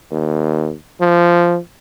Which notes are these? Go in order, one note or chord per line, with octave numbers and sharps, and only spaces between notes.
D#2
F3